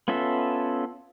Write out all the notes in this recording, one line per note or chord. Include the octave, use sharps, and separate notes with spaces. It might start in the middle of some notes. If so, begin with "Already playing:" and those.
B3 C#4 F4 A4 E5